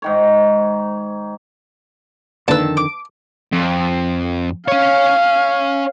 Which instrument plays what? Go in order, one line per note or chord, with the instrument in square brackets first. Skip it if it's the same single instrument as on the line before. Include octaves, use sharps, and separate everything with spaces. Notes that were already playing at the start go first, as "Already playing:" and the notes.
[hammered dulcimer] G#2 D#3 C#5
[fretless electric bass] F2 D3 D#3 [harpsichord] A#2 B4 [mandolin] A5 E6
[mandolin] D6
[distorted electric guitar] F2
[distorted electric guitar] C#4 C#5 [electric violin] F5